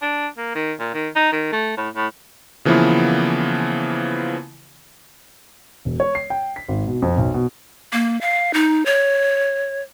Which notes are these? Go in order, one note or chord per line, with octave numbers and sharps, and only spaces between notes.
D4
A#3
D#3
A#2
D#3
D#4
D#3
A3
A2
A2
C#3 E3 F3 A#3 B3 E4
E1
C#5
C7
G5
B6
G#1
B2
F2
B1
B2
A#3
F5
D#4
C#5